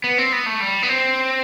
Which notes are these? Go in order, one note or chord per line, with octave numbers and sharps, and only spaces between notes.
B3
C4
B3
A3
G3
B3
C4